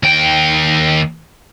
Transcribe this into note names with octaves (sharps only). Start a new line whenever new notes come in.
D#2 G5